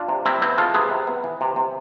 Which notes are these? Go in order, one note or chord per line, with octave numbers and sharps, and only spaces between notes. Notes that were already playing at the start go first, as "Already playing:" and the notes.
Already playing: D4 F4
C3
C3 C4 E4
B3 C4 E4
G#3 F4 A4
C3 G#4 B4
C3
B3
E3
C3
C3